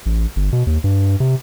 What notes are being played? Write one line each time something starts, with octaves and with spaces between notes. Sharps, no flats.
A1
G1
B2
D#2
G2
C3